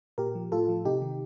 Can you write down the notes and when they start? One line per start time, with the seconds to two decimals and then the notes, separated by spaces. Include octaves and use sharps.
0.18 A#2 G4 A#4
0.35 F3
0.52 A2 F4 A4
0.69 F3
0.85 C3 D#4 G4
1.02 D#3